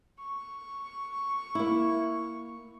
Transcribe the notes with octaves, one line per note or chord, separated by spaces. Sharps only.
C#6
A#3 E4